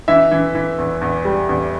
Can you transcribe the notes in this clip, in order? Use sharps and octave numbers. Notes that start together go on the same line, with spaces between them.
E3 E5
E3
E3
E2
E2
G3
E2